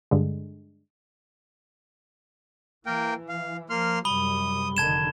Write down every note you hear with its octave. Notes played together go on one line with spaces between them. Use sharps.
G2 D3 G#3
E3 A#3 A#4 G5
F5
F3 A#3 C6 F6
F#2 C3 G3 B5 D#6 G7
F1 D3 D#3 A5 G#6 E7